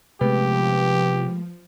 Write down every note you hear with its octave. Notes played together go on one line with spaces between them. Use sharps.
C3 F3 G#3 A3 B3 G4 B4